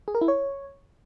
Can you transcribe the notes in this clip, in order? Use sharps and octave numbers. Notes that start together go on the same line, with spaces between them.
G#4
A#4
E4
C#5